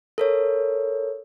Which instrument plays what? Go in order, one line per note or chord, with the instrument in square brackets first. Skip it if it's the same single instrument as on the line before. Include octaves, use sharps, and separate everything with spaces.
[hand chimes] A4 A#4 C#5